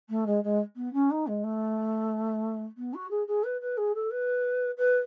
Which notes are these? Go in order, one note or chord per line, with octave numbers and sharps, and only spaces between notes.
A3
G#3
G#3
B3
C#4
D#4
G#3
A3
B3
F#4
G#4
G#4
B4
B4
G#4
A4
B4
B4